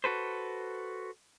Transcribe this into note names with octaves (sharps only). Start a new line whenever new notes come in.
F#4 A4 B4 C5